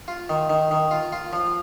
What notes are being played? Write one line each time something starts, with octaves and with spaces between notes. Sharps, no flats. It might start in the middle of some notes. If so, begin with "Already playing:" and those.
F4
D#3
D#3
D#3
F4
F4
F3